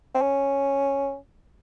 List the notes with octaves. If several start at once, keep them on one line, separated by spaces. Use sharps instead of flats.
C4
C#4